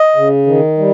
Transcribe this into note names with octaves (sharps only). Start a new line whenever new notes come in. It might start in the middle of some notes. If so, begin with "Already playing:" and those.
Already playing: D#5
C#3
D#3
G3